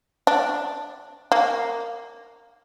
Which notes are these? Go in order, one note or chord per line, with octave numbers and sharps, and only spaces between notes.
D4
A#3